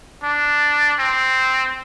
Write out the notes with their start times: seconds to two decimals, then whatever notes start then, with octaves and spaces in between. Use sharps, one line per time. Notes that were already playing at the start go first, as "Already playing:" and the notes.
0.24 D4
1.00 C4